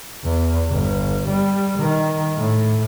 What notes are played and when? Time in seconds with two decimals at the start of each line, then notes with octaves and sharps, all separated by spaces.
0.24 E2
0.70 G1
1.29 G3
1.79 D#3
2.36 A2